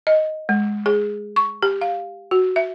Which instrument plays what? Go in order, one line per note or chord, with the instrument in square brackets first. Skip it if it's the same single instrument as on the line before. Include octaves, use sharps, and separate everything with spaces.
[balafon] D#5
G#3
G#4
C#6
G4
F5
F#4
E5